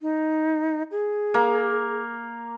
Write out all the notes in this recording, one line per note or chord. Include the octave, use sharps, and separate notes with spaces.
D#4
G#4
A#3